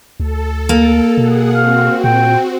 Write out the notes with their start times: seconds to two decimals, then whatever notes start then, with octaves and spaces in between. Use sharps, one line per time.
0.20 D2 A4
0.69 A#3
1.18 B2 G#4 F#5
1.55 C4 F#4 F5
2.04 A#2 G5